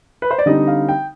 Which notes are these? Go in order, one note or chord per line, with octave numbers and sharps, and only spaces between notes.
B4
C5
D5
D3 G3 C4 D#4 D#5
F5
G5